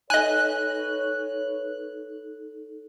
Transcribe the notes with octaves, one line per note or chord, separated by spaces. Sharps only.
D#4 A4 B4 C#5 D#5 G#5 F#6